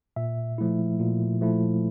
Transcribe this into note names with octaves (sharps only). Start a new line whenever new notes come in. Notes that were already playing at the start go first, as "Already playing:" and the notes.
A#2 E5
F3 A3 E4
A#2
F3 A3 E4